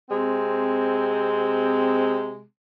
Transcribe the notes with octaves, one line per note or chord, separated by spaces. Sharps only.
C3 G#3 C4